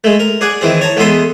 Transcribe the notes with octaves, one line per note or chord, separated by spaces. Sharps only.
G#3 A3
A#4
G#4 D5 F#5 G#5
D#3 E3 C4 G#4
C#5 A5 A#5
E2 G#3 B3 A4 C6 D#6